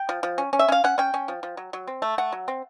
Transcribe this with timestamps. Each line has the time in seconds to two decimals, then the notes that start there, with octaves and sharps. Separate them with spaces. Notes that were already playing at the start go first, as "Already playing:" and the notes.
Already playing: G5
0.09 F3
0.23 F3
0.38 C#4
0.53 C#4
0.59 E5
0.68 C#4 F5
0.84 C#4 F#5
0.98 C#4 G5
1.14 C#4
1.28 F3
1.43 F3
1.57 F#3
1.73 F#3
1.88 C4
2.02 A3
2.18 A3 F#5
2.32 F#3
2.48 C4